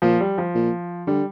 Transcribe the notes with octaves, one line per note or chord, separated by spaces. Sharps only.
A#2 F3
G3
F3
A#2
D3 G3